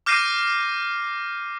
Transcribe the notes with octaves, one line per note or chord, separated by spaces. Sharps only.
D6 F6 G6 A#6 C7 D#7